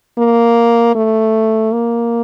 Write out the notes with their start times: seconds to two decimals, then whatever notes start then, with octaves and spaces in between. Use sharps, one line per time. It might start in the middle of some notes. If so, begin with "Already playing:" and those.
0.18 A#3
0.95 A3
1.73 A#3